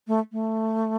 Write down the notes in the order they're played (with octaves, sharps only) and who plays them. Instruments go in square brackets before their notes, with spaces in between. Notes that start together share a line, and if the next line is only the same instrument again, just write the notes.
[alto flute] A3
A3